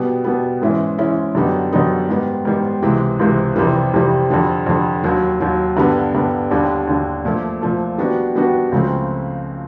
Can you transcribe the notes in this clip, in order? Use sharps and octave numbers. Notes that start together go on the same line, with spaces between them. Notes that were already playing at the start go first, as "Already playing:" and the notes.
Already playing: B2 G3 B3
B2 G3 B3
G#2 E3 G#3 C#4 E4
G#2 E3 G#3 C#4 E4
F#2 D3 G3 B3 D#4
F#2 D3 G3 B3 D#4
G#2 D#3 G3 B3
G#2 D#3 G3 B3
C#2 C3 E3 G#3
C#2 C3 E3 G#3
F2 C3 E3 G3
F2 C3 E3 G3
F2 D3 G3
F2 D3 G3
D#2 D#3 F#3
D#2 D#3 F#3
G2 D3 G3 B3
G2 D3 G3 B3
D#2 D3 G3
D#2 D3 G3
A#2 F3 A3
A#2 F3 A3
D#3 G3 B3 D4 F#4
D#3 G3 B3 D4 F#4
C#2 C#3 F3 A3 C4